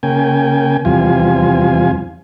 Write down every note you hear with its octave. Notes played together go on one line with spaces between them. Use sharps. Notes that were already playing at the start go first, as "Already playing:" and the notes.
C#3 A#3 G5 G#5
E2 C3 F3 G3 F4 G#5